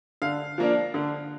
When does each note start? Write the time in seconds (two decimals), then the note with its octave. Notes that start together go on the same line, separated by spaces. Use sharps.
0.22 D3 F5
0.58 F3 A#3 D4
0.94 D3